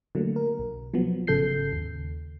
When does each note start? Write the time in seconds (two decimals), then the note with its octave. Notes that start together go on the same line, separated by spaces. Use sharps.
0.15 D3 F#3 A3 A#3
0.36 A#4
0.59 B1
0.94 F3 F#3 B3
1.27 G#1 C#3 A4 G6 C7
1.73 D#2